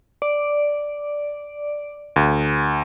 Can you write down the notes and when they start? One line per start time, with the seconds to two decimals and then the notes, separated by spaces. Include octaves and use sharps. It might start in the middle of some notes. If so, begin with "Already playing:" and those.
0.22 D5
2.16 D2